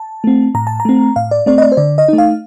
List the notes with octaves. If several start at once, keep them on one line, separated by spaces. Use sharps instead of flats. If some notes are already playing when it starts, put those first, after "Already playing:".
Already playing: A5
A3 C4
A2 A#5
A5
A#5
A3 C4
A2 F5
D5
A3 C4 D5
D#5
D5
C5
D3 D5
D#5
A3 D#4
F5